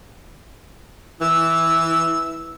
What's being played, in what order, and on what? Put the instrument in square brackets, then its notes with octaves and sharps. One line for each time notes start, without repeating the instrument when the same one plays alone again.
[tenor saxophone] E3 [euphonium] E4 [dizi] E6